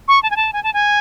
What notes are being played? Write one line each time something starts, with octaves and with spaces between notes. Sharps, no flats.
C#6
A5
G#5
A5
G#5
A5
G#5